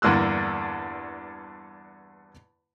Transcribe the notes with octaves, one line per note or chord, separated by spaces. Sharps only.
E2 G2 D3 A#3 E6 F#6